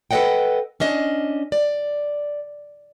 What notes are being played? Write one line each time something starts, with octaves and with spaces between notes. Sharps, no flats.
A4 B4 D5 D#5 F#5 G5
C#4 D4 D#5
D5